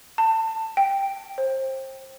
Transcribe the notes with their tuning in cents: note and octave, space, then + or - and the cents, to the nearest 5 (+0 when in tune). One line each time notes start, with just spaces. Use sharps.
A5 +20
G5 +5
C5 +25